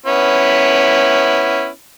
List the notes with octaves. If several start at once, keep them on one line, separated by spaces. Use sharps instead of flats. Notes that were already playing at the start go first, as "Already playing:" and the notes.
B3 C#4 E4